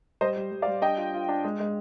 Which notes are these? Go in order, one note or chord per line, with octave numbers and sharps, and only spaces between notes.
G3 C5 D#5
G3
G3
D5 F5
G3
D4 D#5 G5
F4
F4
D4
G#3
G#3